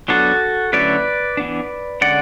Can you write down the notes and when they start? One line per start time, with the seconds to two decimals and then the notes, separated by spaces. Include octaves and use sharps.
0.08 F#3 B3 D4 F#4 A4
0.73 D3 F#3 A3 C#4 E4 B4 D5
1.37 E3 B3 D4
2.01 D3 G#3 C#4 D5 F#5